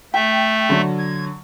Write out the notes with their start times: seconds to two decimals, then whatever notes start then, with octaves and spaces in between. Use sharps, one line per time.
0.14 A3 E5 G5
0.69 D3 F#3
0.98 G#6